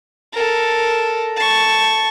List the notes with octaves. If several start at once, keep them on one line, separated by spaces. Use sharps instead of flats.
A4 A#4
A5 C#6